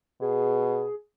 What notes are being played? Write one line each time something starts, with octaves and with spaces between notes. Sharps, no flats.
B2 G#4